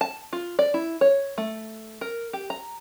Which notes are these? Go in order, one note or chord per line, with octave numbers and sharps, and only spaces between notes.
A5
F4
D5
E4
C#5
A3
A#4
G4
A#5